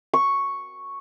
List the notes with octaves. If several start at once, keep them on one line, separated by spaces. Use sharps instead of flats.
C#6